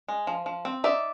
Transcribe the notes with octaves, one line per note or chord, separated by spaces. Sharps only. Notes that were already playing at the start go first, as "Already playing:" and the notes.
G#3
F3
F3
C4
D#4 D5 E5